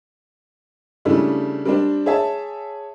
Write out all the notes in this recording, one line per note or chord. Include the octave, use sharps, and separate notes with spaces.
C#3 G3 A3 D4 E4
G3 C4 D4
G#4 C#5 E5 A5